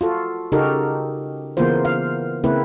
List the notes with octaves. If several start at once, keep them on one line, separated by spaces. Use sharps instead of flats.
F4 F#4 A4
C#3 D#4 F#4 G4 A4 A#4
C#3 E3 A#3 B3 F4 C5
F5
C#3 A#3 C4 E4 B4